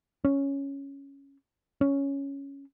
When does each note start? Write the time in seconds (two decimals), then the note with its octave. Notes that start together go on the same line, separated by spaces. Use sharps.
0.25 C#4
1.81 C#4